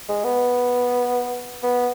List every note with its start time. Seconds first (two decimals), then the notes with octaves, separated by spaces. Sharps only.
0.09 G#3
0.24 B3
1.63 B3